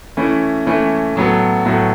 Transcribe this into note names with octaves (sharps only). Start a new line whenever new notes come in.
E3 A3 C#4 E4
E3 A3 C#4 E4
A2 F#3 B3 F#4 A4
A2 F#3 B3 F#4 A4